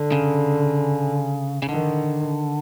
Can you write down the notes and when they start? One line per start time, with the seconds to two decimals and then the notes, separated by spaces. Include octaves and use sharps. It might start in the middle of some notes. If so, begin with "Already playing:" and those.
Already playing: D3
0.12 C#3
1.62 C#3
1.69 D3 D#3